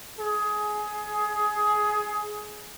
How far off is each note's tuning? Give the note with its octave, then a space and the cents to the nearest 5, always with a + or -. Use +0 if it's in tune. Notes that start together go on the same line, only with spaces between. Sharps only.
G#4 +15